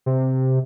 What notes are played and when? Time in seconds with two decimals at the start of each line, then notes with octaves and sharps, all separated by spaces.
0.06 C3